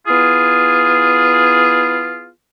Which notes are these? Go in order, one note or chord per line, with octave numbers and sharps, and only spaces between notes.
B3 E4 F4 G#4